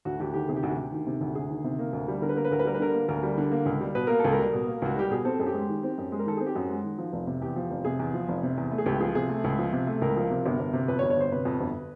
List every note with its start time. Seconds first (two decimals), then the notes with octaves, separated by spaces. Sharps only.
0.05 D2 F#4
0.20 D2 G4
0.34 D#3 G4
0.48 C3 G#4
0.56 G4
0.63 D2 F#4
0.70 G4
0.78 D2
0.92 D#3
1.06 C3
1.21 D2
1.35 D2 G#4
1.50 D#3
1.64 C3
1.79 A#3
1.93 D2
2.08 G3
2.22 D3 A#4
2.29 B4
2.36 A#3 A#4
2.45 B4
2.51 D2 A#4
2.59 B4
2.65 G3 A#4
2.74 B4
2.80 D3 A#4
2.94 A#3
3.09 D2 A#4
3.23 G3
3.37 D3
3.52 A#3
3.66 C#2
3.81 G3
3.95 B2 B4
4.07 A#3 A#4
4.20 C#2 A4
4.32 A#4
4.39 G3
4.53 B2
4.67 A#3
4.82 C#2 F#4
4.96 G3 G4
5.10 B2 G#4
5.25 C4 A4
5.39 F#2 G#4
5.46 G4
5.54 G#3
5.69 D#3
5.83 C4
5.98 F#2
6.12 G#3
6.19 A#4
6.26 D#3 A4
6.37 C4 G#4
6.46 G4
6.55 F#2 F#4
6.69 G#3
6.84 D#3
6.99 F3
7.12 F1
7.27 C3
7.42 E2 G4
7.56 F3
7.70 F1
7.85 C3 G#4
7.99 E2
8.14 F3
8.28 F1
8.43 C3
8.57 E2
8.71 A3
8.78 G#4
8.86 C#2 G4
9.00 F3 G#4
9.15 C3 G#4
9.29 A3
9.44 C#2
9.58 F3
9.73 C3
9.87 A3
10.02 C#2 A#4
10.16 F3
10.30 C3
10.46 G1
10.59 G1
10.73 C3
10.88 F2 B4
10.99 C#5
11.03 G1
11.10 C#5
11.17 G1 C5
11.32 C3 B4
11.45 F2
11.60 G1